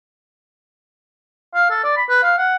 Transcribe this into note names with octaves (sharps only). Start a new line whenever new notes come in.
F5
A4
D5
B5
B4
F5
F#5